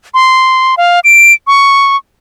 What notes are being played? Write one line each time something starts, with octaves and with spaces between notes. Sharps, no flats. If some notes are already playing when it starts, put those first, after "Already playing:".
C6
F5
D7
C#6